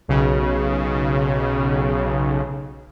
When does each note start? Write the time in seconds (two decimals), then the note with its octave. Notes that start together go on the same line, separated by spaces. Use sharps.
0.08 B1 C#3